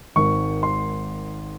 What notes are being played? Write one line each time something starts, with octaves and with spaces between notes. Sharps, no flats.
G#1 G#2 D#3 C#6
C6